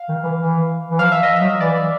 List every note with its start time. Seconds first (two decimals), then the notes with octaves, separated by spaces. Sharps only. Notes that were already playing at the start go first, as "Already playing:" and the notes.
Already playing: F5
0.09 D#3
0.23 E3
0.39 E3
0.90 E3
0.99 F3 F5
1.12 E5
1.23 D#5
1.36 F#3 E5
1.61 E3 D5